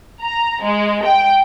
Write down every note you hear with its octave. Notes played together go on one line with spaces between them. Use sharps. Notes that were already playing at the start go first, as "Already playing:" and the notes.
A#5
G#3
G5